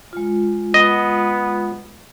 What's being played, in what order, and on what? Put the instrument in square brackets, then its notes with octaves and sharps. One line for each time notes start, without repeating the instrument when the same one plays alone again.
[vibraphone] G#3 F4
[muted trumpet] B3 [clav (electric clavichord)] D#5